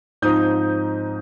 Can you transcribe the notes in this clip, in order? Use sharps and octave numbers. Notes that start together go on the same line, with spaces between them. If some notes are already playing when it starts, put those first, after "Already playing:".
G#2 F3 C4 D#4 D#6 G6